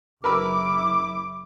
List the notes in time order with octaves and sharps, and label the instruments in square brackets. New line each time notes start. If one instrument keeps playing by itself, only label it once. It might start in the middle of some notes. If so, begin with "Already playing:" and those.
[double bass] F#1 E4 [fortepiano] A#4 B4 E6 [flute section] D6